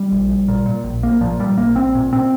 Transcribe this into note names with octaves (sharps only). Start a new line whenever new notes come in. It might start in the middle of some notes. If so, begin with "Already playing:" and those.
Already playing: G3
A#1
A#1
A#2
A#2
A#1
A#1 A#3
A#2 F3
A#2 G3
A#1 A#3
A#1 C4
A#2
A#2 C4